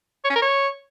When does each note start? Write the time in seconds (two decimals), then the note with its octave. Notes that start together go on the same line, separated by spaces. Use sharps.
0.24 C#5
0.30 C#4
0.36 A#4
0.42 C#5